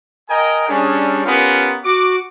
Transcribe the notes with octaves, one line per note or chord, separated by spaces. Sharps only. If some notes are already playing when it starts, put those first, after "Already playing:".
A#4 D#5 G5 G#5 A#5
G3 C#4 D4 G#4
B3 C#4 F4 G4 A#4
F#4 D6